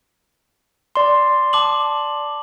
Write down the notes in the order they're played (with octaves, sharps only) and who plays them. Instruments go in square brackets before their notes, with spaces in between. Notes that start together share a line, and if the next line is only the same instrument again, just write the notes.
[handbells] D5 C6
[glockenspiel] A5 D6 F#7